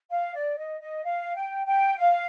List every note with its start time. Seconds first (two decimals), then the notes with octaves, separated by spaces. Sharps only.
0.10 F5
0.34 D5
0.57 D#5
0.81 D#5
1.04 F5
1.35 G5
1.66 G5
1.97 F5